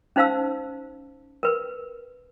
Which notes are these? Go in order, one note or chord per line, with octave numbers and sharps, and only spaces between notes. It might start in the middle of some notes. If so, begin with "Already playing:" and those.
C#4 D#4 C5 F5 A5 E6
A#4 B4